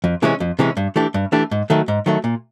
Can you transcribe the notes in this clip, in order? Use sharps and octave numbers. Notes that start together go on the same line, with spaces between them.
F2
C3 E3 G#3 C#4
F2
C3 E3 G#3 C#4
G2
E3 A3 D4 G4
G2
E3 A3 D4 G4
G#2
D#3 F#3 A3
G#2
D#3 F#3 A3
A#2